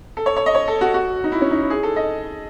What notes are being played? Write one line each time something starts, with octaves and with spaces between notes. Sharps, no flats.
A4
C#5
C#5
D#5
C#5
A4
F#4
F#4
D#4
E4
C#4
D#4
E4
G#4
A4
D#5